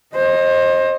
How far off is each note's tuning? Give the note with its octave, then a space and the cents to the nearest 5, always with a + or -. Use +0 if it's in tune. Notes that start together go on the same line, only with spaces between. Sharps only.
C5 +30 D#5 +0